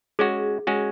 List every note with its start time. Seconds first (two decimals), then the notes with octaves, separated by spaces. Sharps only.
0.19 G#3 C#4 F#4 G#4
0.67 G#3 C#4 F#4